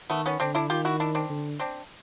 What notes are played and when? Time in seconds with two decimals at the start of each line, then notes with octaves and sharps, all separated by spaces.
0.10 D#3 A3 B3
0.26 B3 C#4
0.40 D3 C4 D4
0.55 D4 E4
0.70 D#3 F4 G4
0.85 E4 F#4
1.00 D4 E4
1.15 C4 D4
1.30 D3
1.60 C4 D4